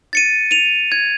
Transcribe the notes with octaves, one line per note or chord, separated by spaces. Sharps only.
A6 C#7 D#7
D#7 F7
G#6